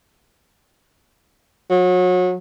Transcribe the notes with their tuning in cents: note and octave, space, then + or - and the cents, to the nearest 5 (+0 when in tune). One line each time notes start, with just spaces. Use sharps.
F#3 -30